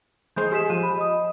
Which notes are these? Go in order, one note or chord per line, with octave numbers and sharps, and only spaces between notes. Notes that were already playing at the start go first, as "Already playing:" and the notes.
E3 G#3 C5 G6
G4 G#4 B6 E7
F3 D#7
B5
D#5 D#6